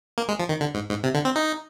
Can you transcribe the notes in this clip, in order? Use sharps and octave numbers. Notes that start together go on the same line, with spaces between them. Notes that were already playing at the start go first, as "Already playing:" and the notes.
A#3
G#3
F3
D#3
D3
G#2
G#2
C3
D3
C4
D#4